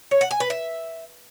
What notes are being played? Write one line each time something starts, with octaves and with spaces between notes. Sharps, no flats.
C#5
F#5
G#5
B4
E5